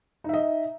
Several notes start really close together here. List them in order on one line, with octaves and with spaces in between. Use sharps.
D#4 E5 D#5